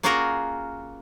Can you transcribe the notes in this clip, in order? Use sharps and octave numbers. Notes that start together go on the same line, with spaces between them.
A#3 C#4 F4 F#4 G#4 A#4